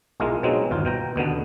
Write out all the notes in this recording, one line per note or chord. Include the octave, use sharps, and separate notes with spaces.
B1 G#3 E4 F4 A#4
B2 F#3 G#3 C4 D#4
G1 D#2 F4
B2 G5 A#5
D#2 B2 D3 B3